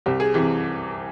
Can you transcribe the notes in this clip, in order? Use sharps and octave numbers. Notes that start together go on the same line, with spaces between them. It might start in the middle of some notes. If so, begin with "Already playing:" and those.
C2 G4
G#4
C3 E3 G4